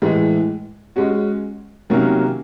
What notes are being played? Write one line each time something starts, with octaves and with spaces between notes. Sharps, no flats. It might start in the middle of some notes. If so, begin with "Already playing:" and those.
A2 E3 G#3
G#3 C#4 F#4
C3 D#3 F#3 A#3 C#4